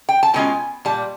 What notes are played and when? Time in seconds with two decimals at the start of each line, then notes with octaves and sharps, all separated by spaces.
0.09 G5
0.23 A5
0.34 B2 G#3 C#4 F4 G#5
0.85 A#2 G3 A5